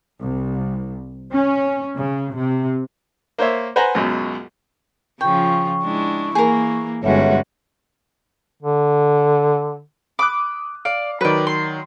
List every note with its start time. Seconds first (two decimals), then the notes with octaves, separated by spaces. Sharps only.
0.21 C2
1.32 C#4
1.97 C#3
2.37 C3
3.38 A#3 C5 C#5 E5
3.76 B4 C5 F#5 G#5 A#5
3.95 C#2 F#2 B2
5.21 C#3 F3 F4 G5 C#6
5.84 G#3 D4 E4
6.35 E3 A#3 G#4 A#4
7.03 G1 G3 G#3 C#4 F#4 C#5 E5 F#5
8.62 D3
10.19 B5 D6 D#6 F#6
10.85 D5 F5
11.21 D#3 F#3 B4 D5
11.47 C6